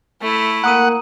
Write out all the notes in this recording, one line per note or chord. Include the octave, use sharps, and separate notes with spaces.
A3 E4
A#3 F#5 A#5 D#6 D#7